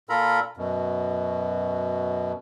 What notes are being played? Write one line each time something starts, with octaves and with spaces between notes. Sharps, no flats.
A#2 F4 A4 A#4 A#5 B5
F#2 B2